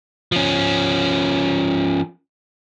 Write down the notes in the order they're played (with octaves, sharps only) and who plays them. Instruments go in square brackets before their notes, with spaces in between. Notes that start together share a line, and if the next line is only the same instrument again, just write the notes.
[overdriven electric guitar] F3 C#4